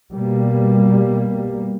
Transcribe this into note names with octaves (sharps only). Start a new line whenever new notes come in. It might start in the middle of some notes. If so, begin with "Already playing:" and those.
B2 G3 A#3